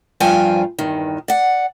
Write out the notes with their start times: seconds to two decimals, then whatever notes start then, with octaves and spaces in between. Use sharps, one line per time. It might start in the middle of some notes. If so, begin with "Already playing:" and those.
0.20 G2 F3 C5 G5 G#5
0.79 E2 G2 D#3
1.28 D5 F#5